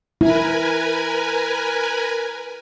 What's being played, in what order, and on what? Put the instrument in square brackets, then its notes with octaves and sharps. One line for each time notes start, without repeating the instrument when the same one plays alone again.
[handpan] E4 [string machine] A#4 B4 G#5